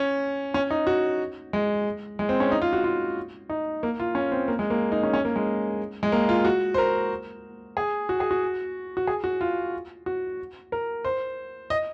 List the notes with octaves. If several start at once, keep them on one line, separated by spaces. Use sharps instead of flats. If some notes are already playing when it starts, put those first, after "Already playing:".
Already playing: C#4
C#4
D#4
F#4
G#3
G#3
C4
C#4
D#4
F4
F#4
F4
D#4
A#3
F4
C#4
C4
A#3
G#3
A#3
D#4
C#4
C#4
A#3
G#3
G#3
A#3
F4
F#4
C5
A#4
G#4
F#4
G#4
F#4
F#4
G#4
F#4
F4
F#4
A#4
C5
D#5